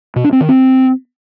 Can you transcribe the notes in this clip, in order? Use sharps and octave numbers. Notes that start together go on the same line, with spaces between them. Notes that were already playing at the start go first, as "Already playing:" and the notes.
B2
D4
C4
D#3
C4